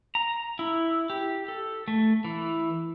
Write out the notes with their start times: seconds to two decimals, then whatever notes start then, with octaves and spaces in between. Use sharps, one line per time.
0.15 A#5
0.59 E4
1.10 G4
1.48 A4
1.88 A3
2.25 E3